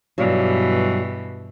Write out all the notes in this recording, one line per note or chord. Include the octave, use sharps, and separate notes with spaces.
G2 B2 E3 F#3 G3 F4